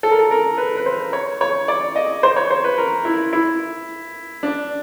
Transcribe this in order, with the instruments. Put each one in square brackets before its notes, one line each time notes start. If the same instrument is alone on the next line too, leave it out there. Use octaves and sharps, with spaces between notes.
[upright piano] A4
A#4
A4
A#4
B4
B4
C5
C#5
C#5
D5
D#5
C5
C#5
C5
B4
A#4
E4
E4
D4